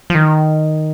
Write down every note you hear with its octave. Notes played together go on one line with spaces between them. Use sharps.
F3
D#3